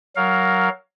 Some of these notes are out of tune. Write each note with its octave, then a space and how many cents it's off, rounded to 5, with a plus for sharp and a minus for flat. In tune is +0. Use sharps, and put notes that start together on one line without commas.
F#3 +15 A#4 +0 F5 +10